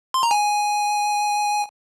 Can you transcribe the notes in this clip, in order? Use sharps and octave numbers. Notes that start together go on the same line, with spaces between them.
C6
A#5
G#5